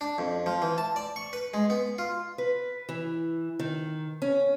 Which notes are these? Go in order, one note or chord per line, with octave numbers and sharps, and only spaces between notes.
D4
F2
F3
E3
A5
D5
C#6
B4
G#3
B3
F4
B4
E3
D#3
C#4